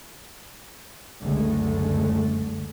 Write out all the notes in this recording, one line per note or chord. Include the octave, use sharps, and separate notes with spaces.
F#1 C#2 D3 G#3 A3